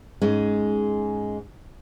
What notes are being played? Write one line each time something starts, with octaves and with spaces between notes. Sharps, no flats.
G#2 G#3 C#4